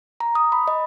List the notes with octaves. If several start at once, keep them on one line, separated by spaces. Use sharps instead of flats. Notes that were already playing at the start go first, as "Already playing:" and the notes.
A#5
D#6
B5
D#5